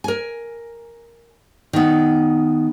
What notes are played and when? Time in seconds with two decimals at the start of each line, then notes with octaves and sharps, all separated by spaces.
0.04 A#4 G#5
1.73 D#3 B3